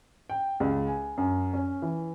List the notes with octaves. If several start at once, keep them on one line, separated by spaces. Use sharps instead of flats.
G5
C#2
G#5
F#2
C#4
E3